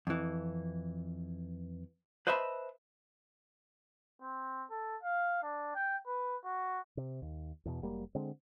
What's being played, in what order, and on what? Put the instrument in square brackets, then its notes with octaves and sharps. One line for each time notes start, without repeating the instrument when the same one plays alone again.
[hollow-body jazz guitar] F2 E3
B4 C5 D#5 E5 A5 B5
[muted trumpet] C4
A4
F5
D4
G5
B4
F#4
[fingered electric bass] C3
D#2
E2 B2
F1 F#3 G3 A#3
D3 G#3 C4